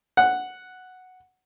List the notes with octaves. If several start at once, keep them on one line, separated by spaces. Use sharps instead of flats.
F#5